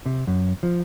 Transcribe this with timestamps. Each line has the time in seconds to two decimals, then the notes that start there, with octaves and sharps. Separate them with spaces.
0.06 C3
0.27 F#2
0.63 F3